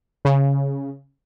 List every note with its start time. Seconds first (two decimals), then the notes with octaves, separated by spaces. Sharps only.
0.25 C#3